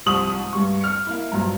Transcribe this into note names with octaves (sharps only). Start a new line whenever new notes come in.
C2 C3 F3 C#6 D#6 F#7
G#2
G2 G3 C#6
F6 C#7
A#3 E4
A#1 G2 F#3 A#5